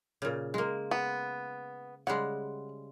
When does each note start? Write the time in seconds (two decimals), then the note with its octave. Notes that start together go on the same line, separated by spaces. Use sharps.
0.22 A#2 C#3
0.54 G#3 A#3
0.91 B3
2.07 C#3 G3 G#3 F#5